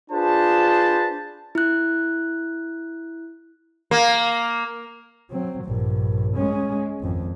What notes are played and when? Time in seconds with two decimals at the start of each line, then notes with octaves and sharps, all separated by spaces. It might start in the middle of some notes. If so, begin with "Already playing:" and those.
0.11 D4 F4 G#4 B4 C5 A5
1.55 E4 F#6
3.91 A#3
5.30 F#3 C4
5.64 A#1 G2
6.36 G#3 C#4
7.00 G#1 F2